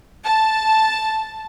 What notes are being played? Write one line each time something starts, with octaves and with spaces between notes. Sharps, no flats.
A5